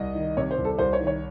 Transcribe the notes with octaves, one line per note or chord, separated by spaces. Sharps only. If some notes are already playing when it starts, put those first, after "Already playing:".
Already playing: C2 D#5
D#3
C3 C#5
C5
C2
A4
C2 C5
C#5
D#3
C#5